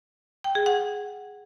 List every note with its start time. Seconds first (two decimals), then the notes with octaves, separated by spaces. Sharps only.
0.44 G5
0.55 G#4
0.66 F#5